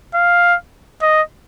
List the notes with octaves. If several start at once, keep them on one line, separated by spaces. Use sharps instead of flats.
F5
D#5